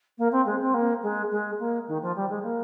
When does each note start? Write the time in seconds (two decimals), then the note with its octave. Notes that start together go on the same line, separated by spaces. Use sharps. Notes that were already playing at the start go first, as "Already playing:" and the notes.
0.18 A#3
0.32 C4
0.46 G#3
0.61 C4
0.74 A#3
1.03 G#3
1.31 G#3
1.59 A#3
1.88 D#3
2.02 F3
2.16 G3
2.30 G#3
2.43 A#3